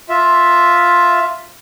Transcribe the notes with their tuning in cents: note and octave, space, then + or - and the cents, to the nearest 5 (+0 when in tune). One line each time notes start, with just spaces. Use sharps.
F4 +5 E5 +0